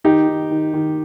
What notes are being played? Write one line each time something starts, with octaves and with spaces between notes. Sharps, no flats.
D#3 D#4 G4
D#3
D#3
D#3